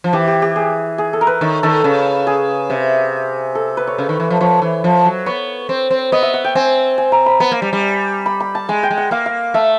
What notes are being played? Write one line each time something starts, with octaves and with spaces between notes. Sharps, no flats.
F3
E3 G4
G4
G4
G#4
G#4
A4
A#4
B4
D#3 C#5
D#3 A4
C#3
G#4
C3
A4
B4
C#5
C#3
D#3
E3
F3
F3 C#5
E3
F3
F#3
B3 C#5
C4
C4
B3 D#5
E5
F#5
G5
C4 G#5
G#5
A#5
B5
B3 B5
A#3
G3
G3
B5
B5
A5
G#3 G#5
G5
G#3
F#5
A#3 F5
F5
A3 E5